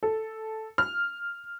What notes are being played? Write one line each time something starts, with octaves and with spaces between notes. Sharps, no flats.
A4
F6